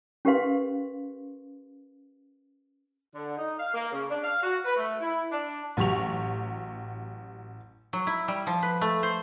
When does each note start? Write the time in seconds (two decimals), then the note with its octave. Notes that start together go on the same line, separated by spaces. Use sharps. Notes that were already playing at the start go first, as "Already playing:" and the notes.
0.25 C#4 G4 A#4 B4 F5 C6
3.15 D3
3.37 D#4
3.59 F5
3.74 A#3
3.91 C#3
4.09 D4
4.23 F5
4.42 F#4
4.64 B4
4.77 A3
5.01 E4
5.30 D4
5.77 A1 F#3 G4 C#6 F7
7.93 F#3
8.07 E4
8.28 G3
8.47 F3
8.63 B4
8.81 A3
9.03 C5